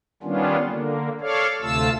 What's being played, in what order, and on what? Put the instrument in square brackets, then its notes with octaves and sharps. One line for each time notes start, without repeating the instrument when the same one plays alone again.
[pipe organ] D#3 G3 B3 C#4 D4 F4
D3 A#3
A4 C#5 D5 F5
D2 C3 A3 F4 A5 E6